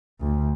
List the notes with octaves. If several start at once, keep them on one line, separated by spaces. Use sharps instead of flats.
D2